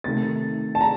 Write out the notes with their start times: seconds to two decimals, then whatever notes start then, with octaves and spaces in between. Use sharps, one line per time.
0.04 C3 D#3 A3 A6
0.75 A5
0.81 A#5